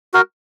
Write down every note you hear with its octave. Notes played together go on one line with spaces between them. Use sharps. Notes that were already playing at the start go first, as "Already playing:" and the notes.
F#4 A#4